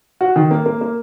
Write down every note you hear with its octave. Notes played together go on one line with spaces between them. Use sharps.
F#4
D#3
A#3
A#3
A#3